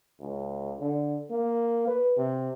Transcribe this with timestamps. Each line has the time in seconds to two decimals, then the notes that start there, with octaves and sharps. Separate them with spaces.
0.20 C#2
0.80 D3
1.30 A#3
1.87 B4
2.17 C3